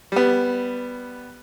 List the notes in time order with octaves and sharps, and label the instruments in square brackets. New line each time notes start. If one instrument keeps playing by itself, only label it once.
[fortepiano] G3 B3